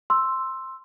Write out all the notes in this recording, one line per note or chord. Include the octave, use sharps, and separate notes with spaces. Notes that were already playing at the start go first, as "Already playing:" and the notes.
C6 E6